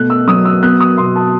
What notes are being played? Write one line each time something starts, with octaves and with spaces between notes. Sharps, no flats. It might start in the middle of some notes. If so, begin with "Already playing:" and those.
Already playing: B2 A3 F#6
E6
F#3 D#6
E6
B3 F#6
D#6
B2 C6
A5